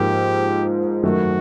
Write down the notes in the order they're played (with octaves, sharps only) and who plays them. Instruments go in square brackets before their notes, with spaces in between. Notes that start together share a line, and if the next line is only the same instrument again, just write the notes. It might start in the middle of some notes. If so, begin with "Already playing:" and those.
Already playing: [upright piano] G#2 F3 A#3 [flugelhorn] G4
[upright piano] F#2 D#3 F#3 A3 [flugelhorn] F#4